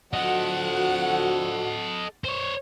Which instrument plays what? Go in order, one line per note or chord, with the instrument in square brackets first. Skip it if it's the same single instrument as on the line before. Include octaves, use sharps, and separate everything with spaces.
[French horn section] D3 F3 F#4 [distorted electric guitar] A4 D#5 [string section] F#5
[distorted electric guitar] C5 C#5